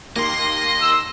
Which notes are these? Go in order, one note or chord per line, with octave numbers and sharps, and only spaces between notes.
D#2 A#3 D#5 C6 A#6
E6